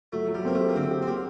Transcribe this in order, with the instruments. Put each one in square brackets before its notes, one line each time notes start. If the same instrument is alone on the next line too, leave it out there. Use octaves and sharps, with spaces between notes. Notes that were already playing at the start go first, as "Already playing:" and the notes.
[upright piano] F#3 [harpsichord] A3
[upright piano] F#3
[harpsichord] G3
[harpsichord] A#3 [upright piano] C4
[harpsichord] A3
[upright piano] G4
[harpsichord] A#3
[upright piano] D3 [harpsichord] C4
[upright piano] G4
[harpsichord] C4
[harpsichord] A#3 [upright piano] G4